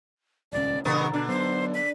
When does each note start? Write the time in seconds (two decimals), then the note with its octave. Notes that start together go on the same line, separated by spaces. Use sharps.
0.53 D#1 C#2 C#4 D5
0.85 G2 A#2 C#3 E3 B3 A#4 C#6
1.14 B2 D3 D4
1.28 F#3 B3 C5
1.74 B6